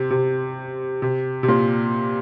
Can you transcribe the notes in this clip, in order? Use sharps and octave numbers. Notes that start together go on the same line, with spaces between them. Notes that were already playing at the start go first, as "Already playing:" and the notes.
Already playing: C3
C3
C3
C3
A#2